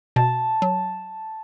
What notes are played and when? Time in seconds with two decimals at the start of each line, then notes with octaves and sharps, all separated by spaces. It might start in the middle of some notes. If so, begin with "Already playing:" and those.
0.16 B2 A5
0.62 F#3